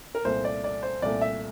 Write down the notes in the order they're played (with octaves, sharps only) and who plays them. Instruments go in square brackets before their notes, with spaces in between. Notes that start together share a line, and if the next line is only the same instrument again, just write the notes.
[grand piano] A#4
C2 A#2 A3 C5
D5
D5
C5
C2 A#2 A3 D5
E5